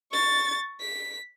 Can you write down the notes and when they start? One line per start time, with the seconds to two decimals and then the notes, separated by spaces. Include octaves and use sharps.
0.12 C#6 A6
0.80 B6